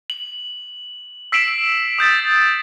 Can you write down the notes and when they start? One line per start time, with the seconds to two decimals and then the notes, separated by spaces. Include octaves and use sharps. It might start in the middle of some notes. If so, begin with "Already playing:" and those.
0.10 F#7
1.32 E6 B6 C7 D7 E7 F#7
1.99 D#6 G6 A6 B6